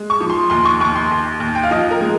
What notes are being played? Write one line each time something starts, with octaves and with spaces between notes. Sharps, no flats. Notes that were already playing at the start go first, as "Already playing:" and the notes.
Already playing: G#3
C#6
F3
C6
D#2 C6
C#6
D#2 C#6
C6
D#2
D#2
G5
F5
F3 D#5
A#4
G#3